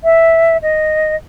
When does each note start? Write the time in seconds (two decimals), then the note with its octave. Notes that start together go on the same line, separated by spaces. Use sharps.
0.04 E5
0.63 D#5